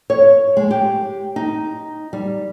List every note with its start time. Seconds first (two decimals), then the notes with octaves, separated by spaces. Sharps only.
0.10 C#5
0.57 G#3
0.71 G4
1.36 D#4
2.13 G3